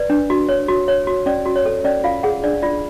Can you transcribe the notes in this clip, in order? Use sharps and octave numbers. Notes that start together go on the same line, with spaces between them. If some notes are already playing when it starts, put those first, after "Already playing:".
Already playing: B4 D5
D4
F#4
C#5
F#4
C#5
F#4
C#4 D5
F#4
C#5
A4
C#4 D5
F4 F5
G#4 F#5
D4 D5
F4 D5